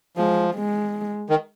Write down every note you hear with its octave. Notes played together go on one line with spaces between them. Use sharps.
F3 G#3
G#3
D#3